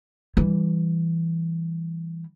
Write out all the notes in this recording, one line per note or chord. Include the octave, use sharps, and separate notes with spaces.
E3 G3